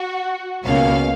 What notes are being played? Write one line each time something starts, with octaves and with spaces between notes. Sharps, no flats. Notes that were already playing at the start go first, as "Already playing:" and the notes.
Already playing: F#4
C#2 B2 A#3 C#4 F5